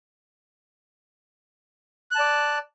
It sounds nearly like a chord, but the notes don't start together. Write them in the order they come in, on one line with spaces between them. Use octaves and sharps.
F#6 A5 D5